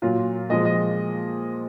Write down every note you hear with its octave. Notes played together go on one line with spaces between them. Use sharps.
A#2 F#3 F4
A#2 F3 G#3 D#5
D#5